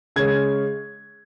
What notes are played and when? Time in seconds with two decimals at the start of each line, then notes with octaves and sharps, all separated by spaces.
0.16 C#3 G#3 C#4 G#6